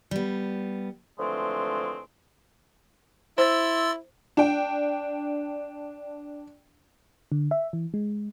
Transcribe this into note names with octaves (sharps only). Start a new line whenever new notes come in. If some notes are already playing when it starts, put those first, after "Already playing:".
G3 B3
D3 E3 F3 G#3 A3 C4
E4 C5 C6 E6 A6
D4 G5
D3
E5
E3
G#3